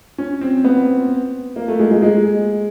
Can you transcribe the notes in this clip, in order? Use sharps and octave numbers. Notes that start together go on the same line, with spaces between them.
C#4
C4
B3
A#3
A3
G#3
G#3
G#3